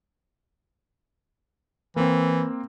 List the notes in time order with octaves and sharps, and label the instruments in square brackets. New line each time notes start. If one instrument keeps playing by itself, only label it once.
[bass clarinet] E3 [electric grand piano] A#3 C4